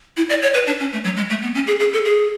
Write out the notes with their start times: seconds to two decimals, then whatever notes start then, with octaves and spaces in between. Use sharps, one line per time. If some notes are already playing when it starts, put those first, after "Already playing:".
0.17 E4
0.30 D5
0.42 C#5
0.54 B4
0.67 D4
0.80 C#4
0.93 A3
1.04 F#3
1.17 G#3
1.30 A3
1.42 B3
1.55 C#4
1.67 G#4
1.80 G#4
1.93 A4
2.05 G#4